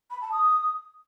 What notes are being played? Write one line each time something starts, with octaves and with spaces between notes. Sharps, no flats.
B5
A5
D#6